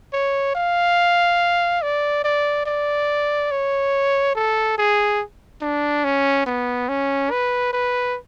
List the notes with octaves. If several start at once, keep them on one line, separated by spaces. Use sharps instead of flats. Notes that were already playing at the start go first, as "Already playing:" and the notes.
C#5
F5
D5
D5
D5
C#5
A4
G#4
D4
C#4
B3
C#4
B4
B4